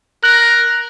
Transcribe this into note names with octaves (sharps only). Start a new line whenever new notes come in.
A#4 F#6